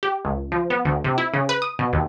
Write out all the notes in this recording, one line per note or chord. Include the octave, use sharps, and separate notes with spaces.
G4
C#2
F3
B3
D2
C3
E4
C#3
B4
D#6
B2
D#2